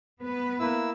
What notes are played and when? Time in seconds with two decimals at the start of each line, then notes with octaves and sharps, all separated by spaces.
0.21 B3 B4
0.59 A#3 E4 E6